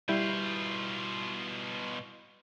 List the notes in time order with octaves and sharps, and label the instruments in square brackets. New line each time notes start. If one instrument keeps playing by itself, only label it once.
[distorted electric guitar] B2 F4 [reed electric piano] G3 E4 G6